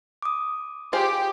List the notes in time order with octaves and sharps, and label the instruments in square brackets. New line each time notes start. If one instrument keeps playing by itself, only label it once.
[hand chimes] D6 D#6
[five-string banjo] F4 G#4 C5 [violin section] G4